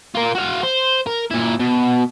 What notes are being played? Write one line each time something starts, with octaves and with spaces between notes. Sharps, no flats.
F4 A#4
F#4 F5
C5
A#4
A#2 E4
B2